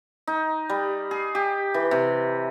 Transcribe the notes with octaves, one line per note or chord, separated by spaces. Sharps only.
D#4
G3
G#4
G4
E3
C3